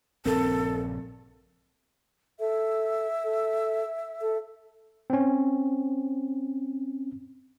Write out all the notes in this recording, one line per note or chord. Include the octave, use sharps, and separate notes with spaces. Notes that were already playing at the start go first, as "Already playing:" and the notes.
A#1 G2 C#3 C4 A4 A#4
A4 E5
A4
A4
C4 C#4